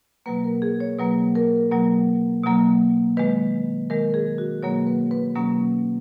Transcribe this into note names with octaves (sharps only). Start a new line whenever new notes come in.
B2 F#3 A#3 B4
A#4
G#4
C#5
B2 F#3 A#3 B4
A#4
B2 F#3 A#3
B2 F#3 A#3
D#3 G#3 B4
D#3 G#3 A#4
G#4
F#4
B2 F#3 A#3 C#5
B4
B4
B2 F#3 A#3 C#4